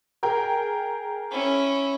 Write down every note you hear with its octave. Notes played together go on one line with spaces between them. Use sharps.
G#4 A#4 G5
C#4 E4